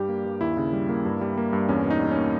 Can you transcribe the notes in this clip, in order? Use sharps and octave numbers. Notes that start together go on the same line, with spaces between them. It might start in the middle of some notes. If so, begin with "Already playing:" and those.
Already playing: G2 G3 G4
A#3
G2
D#2 E4
C#3
G3
A#3
G2
G3
A#3
G2
E2 C#4
B2
D#4
G3
C#4
A#3